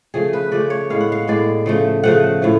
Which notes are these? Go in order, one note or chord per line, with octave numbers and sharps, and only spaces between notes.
C#3 F3 A3 G#4
B4
C#3 F3 A3 D5
C#5
A2 G#3 B3 F5
F#5
F5
A2 G#3 B3 D5
C#3 F3 A3
C#3 F3 A3 F#5
A2 F3 A3